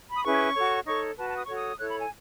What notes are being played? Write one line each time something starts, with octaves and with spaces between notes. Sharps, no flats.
B5
D#6
C#4 E4 G#4 B4 C#6
F#4 A4 C#5
D#4 A4 C#5 C#6
F#4 B4 A5
A5
D#6
F#4 A4 C#5 C#6
D#6
E4 A4 C#5 F#6
B5
G#5